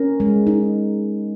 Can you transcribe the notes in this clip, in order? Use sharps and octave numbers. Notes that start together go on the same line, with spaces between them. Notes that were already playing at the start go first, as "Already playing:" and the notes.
Already playing: C#4 A#4
G#3
D#4